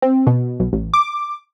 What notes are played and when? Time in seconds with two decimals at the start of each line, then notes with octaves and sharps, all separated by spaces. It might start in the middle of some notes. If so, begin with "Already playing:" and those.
0.02 C4
0.27 B2
0.60 B1
0.73 A1
0.94 D6